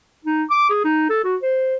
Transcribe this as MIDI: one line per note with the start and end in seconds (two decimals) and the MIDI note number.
0.25 0.44 63
0.50 0.69 86
0.70 0.84 68
0.84 1.07 63
1.09 1.24 69
1.24 1.36 66
1.42 1.76 72